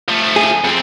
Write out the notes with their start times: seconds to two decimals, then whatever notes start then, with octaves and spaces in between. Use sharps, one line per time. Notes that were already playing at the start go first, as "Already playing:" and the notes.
0.09 F3 A3
0.36 G#4
0.64 F2 C4